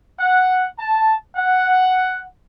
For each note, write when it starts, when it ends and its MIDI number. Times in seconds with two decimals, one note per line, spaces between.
0.19 0.66 78
0.79 1.15 81
1.36 2.24 78